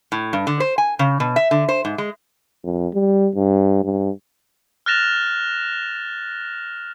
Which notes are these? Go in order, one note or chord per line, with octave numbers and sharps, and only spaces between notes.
A2
G2
D3
C5
G#5
C#3
B2
E5
D3
C5
G#2
G#3
F2
G3
G2
G2
F6 F#6 A6 A#6 E7 F7